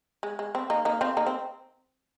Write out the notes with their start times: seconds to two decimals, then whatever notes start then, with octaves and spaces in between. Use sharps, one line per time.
0.23 G#3
0.39 G#3
0.55 C4
0.70 A#3 D#4
0.85 A#3 D#4
1.01 C4 F4
1.17 A#3 D#4
1.26 C4